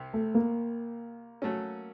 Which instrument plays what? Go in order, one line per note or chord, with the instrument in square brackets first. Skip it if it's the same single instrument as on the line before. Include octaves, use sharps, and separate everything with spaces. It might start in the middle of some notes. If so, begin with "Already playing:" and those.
Already playing: [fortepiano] C2 C3
[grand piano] A3
A#3
[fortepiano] F#3 A3 C#4